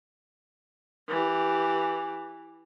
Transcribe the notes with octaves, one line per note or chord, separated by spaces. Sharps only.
E3 G4